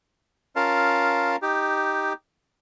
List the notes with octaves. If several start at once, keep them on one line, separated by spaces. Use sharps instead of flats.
C#4 F4 A#4 F5 A5
D#4 G4